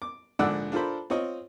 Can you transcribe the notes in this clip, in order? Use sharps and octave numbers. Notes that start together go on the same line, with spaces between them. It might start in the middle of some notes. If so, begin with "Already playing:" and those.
D6
A#1 G#2 D3 D5 F#5 E6
D4 F4 A4 A#4 C5 B5
C4 F4 C#5 D#5